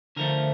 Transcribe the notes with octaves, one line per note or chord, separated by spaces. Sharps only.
D3 F3 A3 A#4